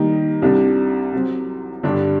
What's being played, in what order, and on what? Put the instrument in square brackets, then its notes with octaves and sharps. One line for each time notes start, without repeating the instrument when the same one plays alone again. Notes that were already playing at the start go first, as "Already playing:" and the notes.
Already playing: [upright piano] D#3 G3 A#3 D#4 G4
C2 C3 G3 D4
C3 F#3 C4
G2 D3 G3 D4 G4